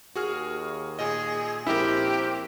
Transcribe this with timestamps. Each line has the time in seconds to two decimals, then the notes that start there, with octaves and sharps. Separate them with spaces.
0.15 D#2 F#4 G#4 F6
0.99 A#2 G#4 D#5
1.67 A#1 C4 E4 G4 A#4